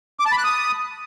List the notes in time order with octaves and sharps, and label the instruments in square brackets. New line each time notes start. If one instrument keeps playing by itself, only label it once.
[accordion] D6
A5
B5
F#6
D#6